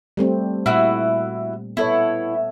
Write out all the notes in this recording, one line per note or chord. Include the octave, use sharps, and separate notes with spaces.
G3 A3 C4
A#2 E4 F#4
B3 E4 A4 C#5